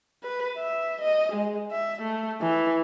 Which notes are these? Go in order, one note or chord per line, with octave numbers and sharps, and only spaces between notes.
B4
E5
D#5
G#3
E5
A3
E3